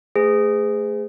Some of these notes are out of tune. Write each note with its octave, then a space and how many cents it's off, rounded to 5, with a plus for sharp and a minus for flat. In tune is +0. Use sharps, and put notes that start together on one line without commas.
A3 +0 G#4 -10 C5 -45